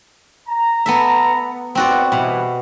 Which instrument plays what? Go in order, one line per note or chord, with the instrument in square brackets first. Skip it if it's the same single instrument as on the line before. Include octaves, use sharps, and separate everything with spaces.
[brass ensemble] A#5
[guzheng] B3 A4 E5
[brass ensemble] A1 B3 [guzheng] C4 F#4 D5
[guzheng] B2 [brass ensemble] E3 G3